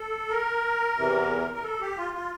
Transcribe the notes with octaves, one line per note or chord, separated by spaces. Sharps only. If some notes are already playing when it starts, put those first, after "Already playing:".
Already playing: A4
A#4
E2 C3 E3
A#4
A4
G4
F4
F4